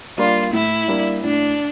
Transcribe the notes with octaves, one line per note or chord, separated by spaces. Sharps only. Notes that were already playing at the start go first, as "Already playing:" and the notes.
G3 A#3 D4 F4
A2 E4
G3 A#3 D4
A2 D4